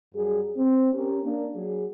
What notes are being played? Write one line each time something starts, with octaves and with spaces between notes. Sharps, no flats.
F#2 F#3 G3 G#4
C4
C#4 G4 A#4
A#3 D4
F#3 G#4